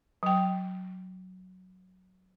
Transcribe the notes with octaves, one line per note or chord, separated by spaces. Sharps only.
F#3 G5